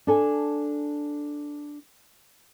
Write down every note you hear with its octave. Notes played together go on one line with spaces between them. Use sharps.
D4 A4 G#5